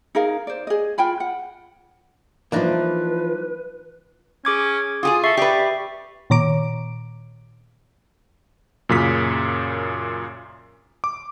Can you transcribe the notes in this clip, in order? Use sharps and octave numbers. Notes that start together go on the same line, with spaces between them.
D#4 G#4 A#4 F5
C5 D5
G#4 D#5
F4 G5 G#5 B5
F#5
E3 F3 A#3 D4 D#4 B4
C#4 G#4 D6 G#6
F4 G4 G#4 D#6
A4 E5 C#6 C7
G4 B4 D5
A#2 D#3 C#5 A#5 D6 D7
F#2 A#2 C#3 B6
D6